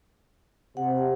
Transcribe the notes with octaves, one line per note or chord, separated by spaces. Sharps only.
C3 F#5